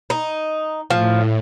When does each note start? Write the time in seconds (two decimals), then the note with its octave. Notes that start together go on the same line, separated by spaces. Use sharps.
0.10 D#4
0.90 A2 F3